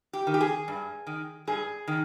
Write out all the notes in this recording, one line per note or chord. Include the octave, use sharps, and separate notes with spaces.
G4
D#3
G4
G#4
G2
D#3
G2 G#4
D#3